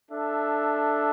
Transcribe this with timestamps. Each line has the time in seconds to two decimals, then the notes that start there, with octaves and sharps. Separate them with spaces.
0.11 D4 A4 E5